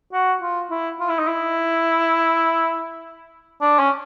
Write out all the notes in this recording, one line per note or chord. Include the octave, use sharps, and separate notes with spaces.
F#4
F4
E4
F4
E4
D#4
E4
D4
C#4